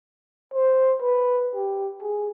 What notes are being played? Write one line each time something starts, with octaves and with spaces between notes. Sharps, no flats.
C5
B4
G4
G#4